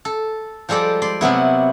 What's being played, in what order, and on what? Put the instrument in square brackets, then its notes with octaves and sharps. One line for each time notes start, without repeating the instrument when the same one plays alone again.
[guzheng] A4
F3 G3 G#3 A4 D5
D5 C6
C3 F#3 B3 E4